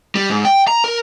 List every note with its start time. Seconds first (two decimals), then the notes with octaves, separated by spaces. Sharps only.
0.15 G3
0.30 G#2
0.45 G5
0.68 A#5
0.84 A#4